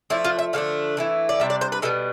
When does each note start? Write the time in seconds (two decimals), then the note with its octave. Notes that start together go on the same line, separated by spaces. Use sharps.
0.10 F3 A3 D4 E4
0.24 F4
0.39 E5
0.53 D3 F3 A3 D4 F5
0.97 E3 A3 E4
1.29 D5
1.40 C3 G3 D4 E5
1.50 D5
1.61 C5
1.72 B4
1.82 B2 G3 B3 A4